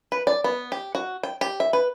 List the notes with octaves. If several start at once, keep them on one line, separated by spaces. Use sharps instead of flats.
B4
D5
B3
G4
F#4
G5
G4
E5
B4